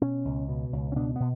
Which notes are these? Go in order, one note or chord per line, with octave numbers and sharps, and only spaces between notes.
B2 C#4
C#2
B2
C#2
C#4
B2 D4
B2 B3